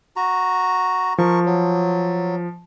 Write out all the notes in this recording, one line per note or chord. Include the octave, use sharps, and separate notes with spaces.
F#4 A#5
F3 A#4 C#6
F#3